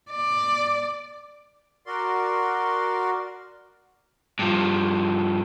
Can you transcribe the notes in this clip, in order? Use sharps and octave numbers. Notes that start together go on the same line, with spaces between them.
D5
F#4 A#4 D5 C6
G2 F3